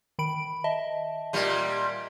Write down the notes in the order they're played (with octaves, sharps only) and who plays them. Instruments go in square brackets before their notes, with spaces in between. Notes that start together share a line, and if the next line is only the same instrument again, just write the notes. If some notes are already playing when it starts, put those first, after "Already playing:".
[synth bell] D#3 B5 D7
D#5 E5 A5
[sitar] A#2 G3